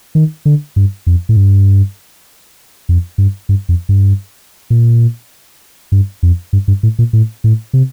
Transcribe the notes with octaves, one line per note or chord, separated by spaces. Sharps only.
D#3
D3
G2
F2
A2
G2
F2
G2
G2
F2
G2
A#2
G2
F2
G2
G2
A2
A#2
A2
A2
C3